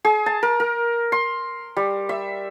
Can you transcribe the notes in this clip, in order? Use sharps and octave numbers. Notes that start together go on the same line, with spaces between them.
G#4
A5
A#4
A#4
C6
G3
E5